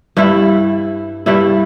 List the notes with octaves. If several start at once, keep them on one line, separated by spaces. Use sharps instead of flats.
G2 G3 E4
G2 G3 E4